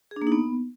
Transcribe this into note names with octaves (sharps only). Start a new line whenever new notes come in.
G#4
D4
A#3
D#4
B3